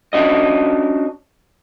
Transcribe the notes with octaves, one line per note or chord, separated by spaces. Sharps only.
C#4 D4 F#4 D#5